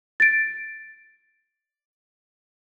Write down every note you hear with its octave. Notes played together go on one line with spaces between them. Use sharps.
A6 D7